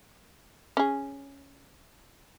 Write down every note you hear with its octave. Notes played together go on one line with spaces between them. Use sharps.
C#4 G#4